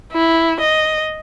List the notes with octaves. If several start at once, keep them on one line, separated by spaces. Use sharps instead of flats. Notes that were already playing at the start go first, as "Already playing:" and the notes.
E4
D#5